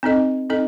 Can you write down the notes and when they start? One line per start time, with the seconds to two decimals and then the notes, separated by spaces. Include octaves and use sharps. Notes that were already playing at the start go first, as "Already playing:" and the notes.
0.03 C4 D#4 A4 D#5
0.50 C4 D#4 A4 D#5